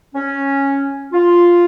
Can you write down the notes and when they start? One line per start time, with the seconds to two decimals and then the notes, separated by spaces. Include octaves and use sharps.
0.14 C#4
1.12 F4